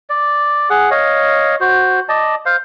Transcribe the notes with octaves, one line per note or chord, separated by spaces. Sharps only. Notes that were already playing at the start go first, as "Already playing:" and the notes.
D5
G#4 F#5
C#5 D#5 F5
F#4 C5
D5 D#5 A5
C5 F5